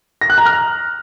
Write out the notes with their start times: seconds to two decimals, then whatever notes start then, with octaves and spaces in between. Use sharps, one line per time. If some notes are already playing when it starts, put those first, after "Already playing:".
0.21 A#6
0.30 F#6
0.38 A#5
0.46 F6